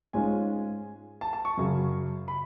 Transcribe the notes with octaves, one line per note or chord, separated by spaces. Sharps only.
G#2 G#3 C#4 F4 G#5
A5
A5
C#6
F#2 C#3 F#3
B5